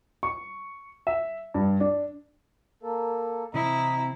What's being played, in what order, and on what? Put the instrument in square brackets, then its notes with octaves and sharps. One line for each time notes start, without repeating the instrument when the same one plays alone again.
[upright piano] C#6
E5
G2
D4
[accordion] A#3 A4 [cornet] A#4
[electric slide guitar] C3 E3 C4 [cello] E4 [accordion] D#5 [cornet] A#5